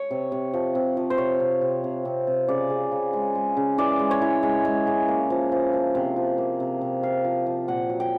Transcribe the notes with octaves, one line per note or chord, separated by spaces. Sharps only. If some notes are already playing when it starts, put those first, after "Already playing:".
Already playing: C#5
C3
C3
F3
C3
F3
C5
C3 C#5
C3
C3
C3
C3
C3
C#3 D5
C#3
C#3
G#3
G#3
C#3
E3 D5
G#3
C#5
E3
G#3
G#3
C#3
A#3
F3
F3
F3
C3
F3
A#3
C3
C3
C3 F5
F3
F3
A#2 F#5
F#3
G5